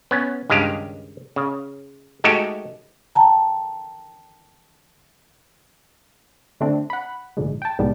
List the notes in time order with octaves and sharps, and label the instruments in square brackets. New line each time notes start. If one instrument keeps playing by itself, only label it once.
[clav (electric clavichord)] B3 C#4
C#2 G2 D#3 G#3 G4 F5
C#3
G#3 A3 D#4 F#4 G4 A4
[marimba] G5 A5 A#5
[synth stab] D3 A3 C4 D4
F#5 B5
A#1 G#2 D3 G#3
G5 A5
C2 A2 D#3 G3 G#3 B3